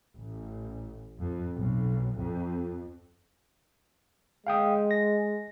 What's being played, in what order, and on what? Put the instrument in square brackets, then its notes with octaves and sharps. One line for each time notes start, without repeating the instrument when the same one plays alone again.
[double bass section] A1
F2
B1
F2
[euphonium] G#3 [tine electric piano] F5 G5 D#6
[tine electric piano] A#6